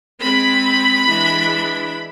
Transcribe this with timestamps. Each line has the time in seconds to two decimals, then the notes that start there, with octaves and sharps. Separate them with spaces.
0.20 G#3 C4 B5
1.05 E3 G#3 D4